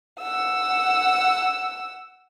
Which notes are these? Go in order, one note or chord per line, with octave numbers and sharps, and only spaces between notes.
F#5 E6